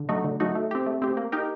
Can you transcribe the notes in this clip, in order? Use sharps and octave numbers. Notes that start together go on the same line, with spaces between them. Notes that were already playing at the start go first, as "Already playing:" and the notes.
Already playing: D3
F#3 A3 D#4 F#4
D3
F#3 A3 D#4 F#4
A3
C4 G4
A3
C4 G4
A#3
D#4 G4 A#4